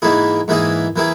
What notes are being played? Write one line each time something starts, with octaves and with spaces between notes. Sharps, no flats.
G#2 E3 A#3 E4 G#4
G#2 E3 A#3 E4 G#4
E3 A#3 E4 G#4